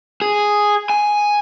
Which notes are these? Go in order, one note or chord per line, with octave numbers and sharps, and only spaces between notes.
G#4
G#5